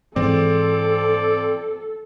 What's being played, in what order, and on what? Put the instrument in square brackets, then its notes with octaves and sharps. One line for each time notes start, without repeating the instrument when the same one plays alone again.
[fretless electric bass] G#2 E3 [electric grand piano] C4 [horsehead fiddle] A4 [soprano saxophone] D5